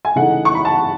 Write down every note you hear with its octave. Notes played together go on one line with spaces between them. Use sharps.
G#5
C#3 E3 A3 D#4 F#5
C#6
B5
A5